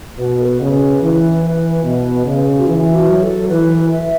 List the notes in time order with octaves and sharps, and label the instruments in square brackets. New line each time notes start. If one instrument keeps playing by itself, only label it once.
[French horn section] B2 [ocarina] B4
[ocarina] A4
B4
[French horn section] C#3
[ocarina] B4
[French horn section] E3
E3
B2
C#3
[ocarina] F#4
[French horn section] E3 [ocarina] E4
[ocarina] F#4
[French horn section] F#3
[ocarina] A4
[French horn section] E3 [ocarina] B4
[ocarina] E5